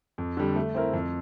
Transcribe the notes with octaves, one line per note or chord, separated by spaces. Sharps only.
F2
D3 G3
A3
C4 E4 A#4
F2